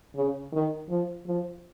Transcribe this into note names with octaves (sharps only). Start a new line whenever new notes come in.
C#3
D#3
F3
F3